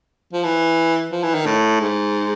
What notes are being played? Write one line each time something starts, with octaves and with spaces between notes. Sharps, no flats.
F3
E3
F3
E3
D#3
A2
G#2